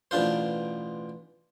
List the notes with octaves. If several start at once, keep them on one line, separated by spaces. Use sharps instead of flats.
A1 B2 D4 F4 C5